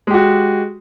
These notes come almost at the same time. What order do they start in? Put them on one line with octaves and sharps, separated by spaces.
G#3 G4 F#4